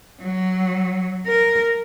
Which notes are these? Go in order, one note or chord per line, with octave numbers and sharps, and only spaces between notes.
F#3
A#4